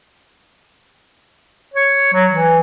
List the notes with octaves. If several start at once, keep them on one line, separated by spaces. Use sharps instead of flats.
C#5
F#3
E3